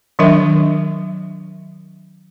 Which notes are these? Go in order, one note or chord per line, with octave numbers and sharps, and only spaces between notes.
D#3 F#3 D4 A#4 E5